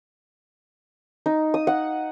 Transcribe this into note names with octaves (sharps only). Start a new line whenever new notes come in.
D#4
D#6
F#5